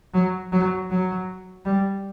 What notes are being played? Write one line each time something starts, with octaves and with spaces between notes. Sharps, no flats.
F#3
F#3
F#3
G3